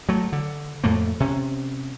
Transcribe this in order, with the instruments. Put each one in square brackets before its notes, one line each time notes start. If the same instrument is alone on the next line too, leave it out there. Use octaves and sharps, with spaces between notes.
[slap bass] F#3 A3
D3
F2 A2 A3 A#3
C3 C#4